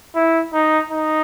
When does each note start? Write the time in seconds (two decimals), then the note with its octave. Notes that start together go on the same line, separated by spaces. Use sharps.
0.15 E4
0.53 D#4
0.89 D#4